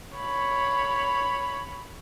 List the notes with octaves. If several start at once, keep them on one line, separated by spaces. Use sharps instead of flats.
C#5 B5